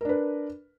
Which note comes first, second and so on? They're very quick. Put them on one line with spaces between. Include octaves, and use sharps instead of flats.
A#4 D4 B4